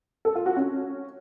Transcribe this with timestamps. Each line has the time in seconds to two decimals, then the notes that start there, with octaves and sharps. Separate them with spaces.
0.25 A4
0.35 F4
0.46 F#4
0.56 C#4